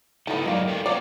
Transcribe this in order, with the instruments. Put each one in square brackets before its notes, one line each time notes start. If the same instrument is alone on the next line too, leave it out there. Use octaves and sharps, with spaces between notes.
[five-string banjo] B3 A4 [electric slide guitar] D#4 E4 G5
[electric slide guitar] F#3 D#4 D5 [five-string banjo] G#3 A#3
[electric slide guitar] A4 B4 G5
[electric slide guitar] A#3 F5 F#5 [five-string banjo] D5